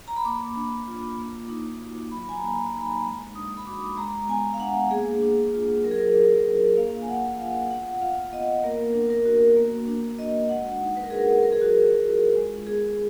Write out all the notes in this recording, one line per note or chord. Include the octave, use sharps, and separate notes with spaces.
A#5
B5
A#3 D6
D4
F4
A#3
D#4
F#4
F#3 B5
G#5
A#5
A#3
A#5
D#4
B5
G#3
D4 D#6
B5
F#4 D6
G#3 A#5
B3 G#5
F5
D4 F#5
A#3 G#4
D4
F4
F#3 A#4
G#4
A#4
D4
F4
A#3 F5
G#5
D4 F#5
F4 F5
B3 F#5
F4 F5
B3 D#5
A#3 A#4
D4
A#4
F#4
A#3
D4
F#4 D#5
G#3 F#5
D#4
B4
A#4
F#4 G#4
A#4
F#3 A#4
G#4
F#4
D4 G#4
F4
G#3
B3 G#4